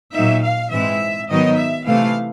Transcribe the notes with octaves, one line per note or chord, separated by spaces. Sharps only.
A#2 F#3 A#3 D#4 E5
F5
G#2 E3 G#3 C4 E5
G#2 D#3 F#3 B3 D#4 D#5
E5
C3 E3 A3 F5